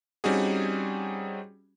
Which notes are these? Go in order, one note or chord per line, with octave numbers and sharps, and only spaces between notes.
G3 C4 C#4 D#4 F#4 G#4